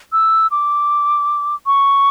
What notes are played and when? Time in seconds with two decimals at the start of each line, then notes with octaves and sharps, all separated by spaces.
0.12 E6
0.51 D6
1.66 C#6